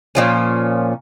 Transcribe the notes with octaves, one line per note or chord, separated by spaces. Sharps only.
A#2 F3 C#4